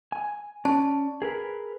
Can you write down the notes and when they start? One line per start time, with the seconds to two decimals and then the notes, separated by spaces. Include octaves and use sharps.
0.12 G#5
0.65 C#4 D5 A5
1.22 G#4 A#4 B4